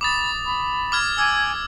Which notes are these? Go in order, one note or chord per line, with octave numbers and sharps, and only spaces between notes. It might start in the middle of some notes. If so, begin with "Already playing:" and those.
B5 D6 D#6 A6
B5
D6 F6 G#6
G#5 D6 E6 G#6